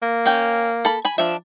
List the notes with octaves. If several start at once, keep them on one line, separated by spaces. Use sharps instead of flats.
A#3
C#4 G5
A4 B5
G#5 B5
F3 D4 E5